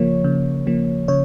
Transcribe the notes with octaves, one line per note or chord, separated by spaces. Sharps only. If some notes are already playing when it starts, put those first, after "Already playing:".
Already playing: C#3 F3 A#3 C#5
C#3
F3 A#3
C#3 C#5